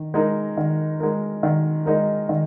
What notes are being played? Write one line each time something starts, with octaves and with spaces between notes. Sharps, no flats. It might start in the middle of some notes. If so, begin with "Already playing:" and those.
Already playing: D#3
G#3 D#4 A#4
D#3
G#3 D#4 A#4
D#3
G#3 D#4 A#4
D#3